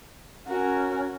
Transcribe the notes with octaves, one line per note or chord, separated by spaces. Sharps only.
C#4 F#4 A#4